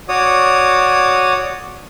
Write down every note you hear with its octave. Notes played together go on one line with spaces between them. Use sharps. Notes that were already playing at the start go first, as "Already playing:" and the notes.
F#4 C#5 D5 D#6